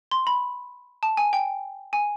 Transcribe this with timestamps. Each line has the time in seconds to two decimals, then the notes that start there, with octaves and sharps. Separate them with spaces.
0.11 C6
0.27 B5
1.03 A5
1.17 G#5
1.33 G5
1.93 G#5